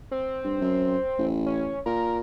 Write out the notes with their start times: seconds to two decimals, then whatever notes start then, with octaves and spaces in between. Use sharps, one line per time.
0.11 C4
0.44 G2
0.61 F#2
1.18 A1
1.46 C#4
1.86 A#2 A#4